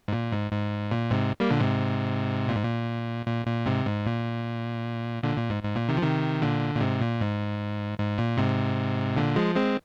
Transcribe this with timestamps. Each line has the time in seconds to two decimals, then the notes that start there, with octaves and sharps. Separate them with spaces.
0.08 G#2
0.13 A#2
0.32 G#2
0.52 G#2
0.91 A#2
1.11 G#2 C3
1.40 G3 A#3
1.51 A#2 D3
1.60 G#2 C3
2.48 A#2
2.56 G#2
2.64 A#2
3.27 A#2
3.47 A#2
3.66 G#2 C3
3.86 G#2
4.06 A#2
5.23 A#2 D3
5.37 A#2
5.50 G#2
5.63 G#2
5.76 A#2
5.89 C3 D#3
5.97 F3
6.02 C3 D#3
6.42 A#2 D3
6.75 A#2
6.81 G#2 C3
7.01 A#2
7.21 G#2
7.98 G#2
8.18 A#2
8.38 G#2 C3
9.17 A#2 D3
9.36 F3 G#3
9.56 G#3 C4